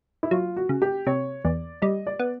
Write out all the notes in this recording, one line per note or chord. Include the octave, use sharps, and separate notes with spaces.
E4
F#3 F4
F#4
C#3
G4
C3 C#5
E2 D5
G3 D#5
D5
B3